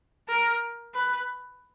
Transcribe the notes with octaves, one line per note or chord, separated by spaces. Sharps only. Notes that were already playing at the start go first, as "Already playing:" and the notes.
A#4
B4